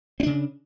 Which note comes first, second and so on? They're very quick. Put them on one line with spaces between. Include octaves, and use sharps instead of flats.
C4 D4 C#3